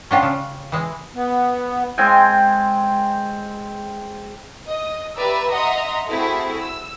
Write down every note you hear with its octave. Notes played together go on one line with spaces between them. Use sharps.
C#4 D4 F4 G5 C#6
C#3
E3 G#3
B3
G#3 C4 G5 G#5
D#5
G4 B4 D5 E5 A#5 E6
D#5 E5 F#5 A#5 C6 D#6
A3 C4 E4 F#4 G#4 A4
E6